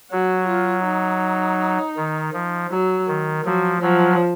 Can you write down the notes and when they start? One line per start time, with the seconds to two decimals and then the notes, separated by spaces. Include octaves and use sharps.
0.11 F#3 F#4
0.48 F4
0.85 D#4
1.97 D#3
2.33 F3
2.70 F#3
3.08 D#3
3.45 F3 F#3
3.82 F3 F#3